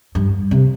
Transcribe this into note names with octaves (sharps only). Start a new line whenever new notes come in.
G2
C3